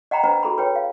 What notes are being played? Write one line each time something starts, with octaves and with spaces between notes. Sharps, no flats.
D#5 F#5 G5 A#5 B5
D4 B4 C5 D#5 F#5 A#5
F#4 G#4 A4 A#5 B5
B4 C#5 G5
F5